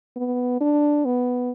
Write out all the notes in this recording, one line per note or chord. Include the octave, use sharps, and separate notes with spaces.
B3
D4
B3